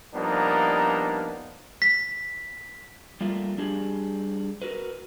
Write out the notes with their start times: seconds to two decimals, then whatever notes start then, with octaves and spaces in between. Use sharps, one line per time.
0.14 F3 G3 A#3 B3 D4 D#4
1.82 B6
3.21 G3 A3 A#3 F4
3.58 G3 D4 G4 G#4
4.62 F#4 A#4 B4